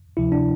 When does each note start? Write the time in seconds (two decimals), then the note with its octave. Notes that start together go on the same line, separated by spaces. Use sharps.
0.17 D2 C3 F3 E4
0.32 D4